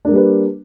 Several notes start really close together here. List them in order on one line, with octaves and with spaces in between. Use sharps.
D4 A#3 G3 B4